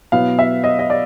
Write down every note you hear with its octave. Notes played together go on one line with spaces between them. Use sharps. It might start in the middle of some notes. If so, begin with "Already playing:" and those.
B2 F#3 B3 E4 F5
E5
D#5
D#5
D5